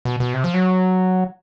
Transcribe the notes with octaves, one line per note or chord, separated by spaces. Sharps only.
B2
B2
C3
F3
F#3